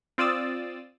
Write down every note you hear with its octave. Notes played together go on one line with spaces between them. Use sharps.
C4 F4 D5 D#6 E6 A6